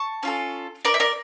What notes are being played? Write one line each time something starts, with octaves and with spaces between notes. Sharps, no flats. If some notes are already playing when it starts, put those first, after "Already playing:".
Already playing: A5 C#6
C#4 F4 A4
A#4 D5
E5
A#4 D5